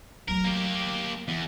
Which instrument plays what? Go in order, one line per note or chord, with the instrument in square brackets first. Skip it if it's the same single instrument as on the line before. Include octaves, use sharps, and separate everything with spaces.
[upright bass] F#3 A3 [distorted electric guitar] A#4
[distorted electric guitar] A#3 G4
E2